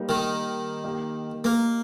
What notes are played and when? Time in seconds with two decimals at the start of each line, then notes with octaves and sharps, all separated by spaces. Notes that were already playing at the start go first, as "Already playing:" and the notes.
Already playing: G3 A#3 D#4 G4 C5
0.09 D#3
0.84 A#3 D#4 G4
1.44 A#3